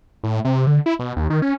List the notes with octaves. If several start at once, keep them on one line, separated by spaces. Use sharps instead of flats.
A2
C3
D3
E4
B2
D#2
D#3
C#4